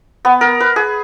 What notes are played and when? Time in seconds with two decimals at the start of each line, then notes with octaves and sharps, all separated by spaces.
0.25 B3
0.41 A#4
0.60 B4
0.76 G#4